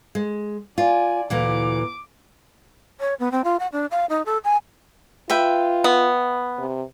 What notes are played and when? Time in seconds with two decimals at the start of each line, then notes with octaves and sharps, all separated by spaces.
0.15 G#3
0.78 F4 D5 G#5
1.30 D2 A#2 E3 D6
3.00 C#5
3.20 B3
3.32 C4
3.44 F4
3.60 F#5
3.72 D4
3.91 F5
4.10 D#4
4.26 A4
4.44 G#5
5.30 F4 B4 E5 G5
5.84 B3
6.58 C3